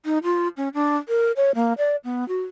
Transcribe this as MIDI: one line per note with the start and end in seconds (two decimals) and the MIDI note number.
0.05 0.18 63
0.23 0.48 65
0.57 0.69 61
0.74 0.97 62
1.09 1.32 70
1.36 1.52 73
1.55 1.73 58
1.78 1.96 74
2.04 2.27 59
2.28 2.41 66